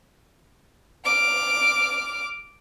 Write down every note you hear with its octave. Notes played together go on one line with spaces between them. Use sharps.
D6 F6